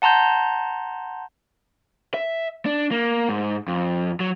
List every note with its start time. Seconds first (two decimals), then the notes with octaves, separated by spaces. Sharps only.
0.02 F#5 A5 A#5 C6 G6
2.14 E5
2.66 D4
2.91 A#3
3.29 G#2
3.68 F2
4.20 F#3